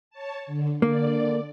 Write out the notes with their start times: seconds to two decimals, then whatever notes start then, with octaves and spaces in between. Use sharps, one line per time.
0.10 C#5 A5
0.47 D3
0.82 D3 A#3 D5